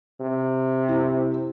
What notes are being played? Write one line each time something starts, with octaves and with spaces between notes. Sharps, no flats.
C3
E4